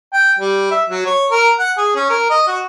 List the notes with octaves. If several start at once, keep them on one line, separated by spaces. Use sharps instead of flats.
G5
G3
E5
F#3
C#5
A#4
F#5
G#4
C#4
A#4
D#5
F#4